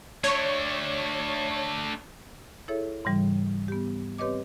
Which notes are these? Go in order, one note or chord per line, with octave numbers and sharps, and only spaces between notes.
A3 D4 C#5
E4 G#4 A4 C#5 E5
G#2 C#3 E3 G3
B3 G4
C4 G4 B4 C#5 D#5 D6